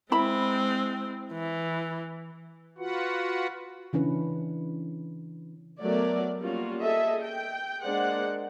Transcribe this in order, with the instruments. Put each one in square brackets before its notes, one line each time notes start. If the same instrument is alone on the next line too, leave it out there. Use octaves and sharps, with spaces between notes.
[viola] G#3 C4 [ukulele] E4 B5
[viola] E3
[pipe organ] F4 F#4 B4 F#5
[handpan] C#3 E3 C#4 D4 B4
[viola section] F#3 A3 B3 A#4 D5
G3 A#3 C#4 F4 F#4
G#4 A4 D#5 E5
G5
G#3 A#3 D4 C5 D5 F#5